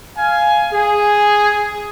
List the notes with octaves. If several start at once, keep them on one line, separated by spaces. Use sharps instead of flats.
F5 G#5
G#4